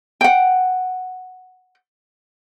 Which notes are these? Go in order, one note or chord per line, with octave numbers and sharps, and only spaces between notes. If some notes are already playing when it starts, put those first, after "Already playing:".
F#5 G5